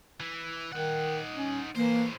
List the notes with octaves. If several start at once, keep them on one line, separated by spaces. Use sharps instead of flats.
E3
D#3 D#4 F#5
C#4
A2 E3 A#3 C5